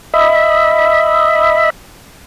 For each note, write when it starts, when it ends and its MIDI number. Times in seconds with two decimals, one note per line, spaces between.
0.14 1.70 75
0.14 1.70 76
0.14 1.70 83